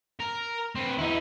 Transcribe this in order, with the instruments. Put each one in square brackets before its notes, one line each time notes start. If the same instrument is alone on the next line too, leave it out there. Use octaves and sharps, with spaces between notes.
[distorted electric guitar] A#4
C4 B4
[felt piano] E2 D#5 [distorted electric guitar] D#4 E4